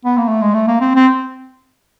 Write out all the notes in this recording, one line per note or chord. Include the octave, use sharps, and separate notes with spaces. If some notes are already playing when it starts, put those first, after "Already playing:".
B3
A#3
A3
G#3
A3
A#3
C4
C4